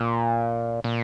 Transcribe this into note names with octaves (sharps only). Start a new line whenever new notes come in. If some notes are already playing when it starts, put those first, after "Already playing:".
Already playing: A#2
A#2